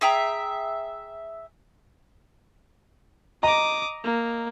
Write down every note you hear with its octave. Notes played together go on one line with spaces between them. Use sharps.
G#4 E5 G5 A#5
D#5 A#5 D6 D#6
A#3